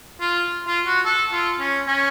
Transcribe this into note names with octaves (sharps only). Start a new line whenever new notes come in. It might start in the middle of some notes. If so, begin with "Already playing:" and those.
F4
F4
F#4
A4
F4
C#4
C#4